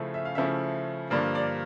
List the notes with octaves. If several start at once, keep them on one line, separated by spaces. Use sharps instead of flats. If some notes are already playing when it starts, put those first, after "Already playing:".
Already playing: C#3 F3 A3 C#4 E4
E5
F5
C#3 F3 A3 C#4 E4 E5
G2 D3 F3 A#3 D5
D5